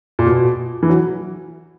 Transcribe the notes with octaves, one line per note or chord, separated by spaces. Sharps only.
A#2
B2
E3
F#3